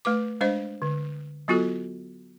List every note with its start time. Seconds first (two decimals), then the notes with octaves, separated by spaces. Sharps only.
0.05 A3 B4 D6
0.41 G#3 D4 C5 D#5
0.82 D3
1.48 F#3 B3 F4 F#4 A4